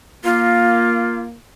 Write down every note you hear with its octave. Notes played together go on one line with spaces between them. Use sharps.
A#3 F4